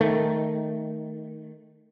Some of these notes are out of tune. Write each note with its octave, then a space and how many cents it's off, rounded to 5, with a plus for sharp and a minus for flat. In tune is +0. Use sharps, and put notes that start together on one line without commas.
D#3 +0 A3 +0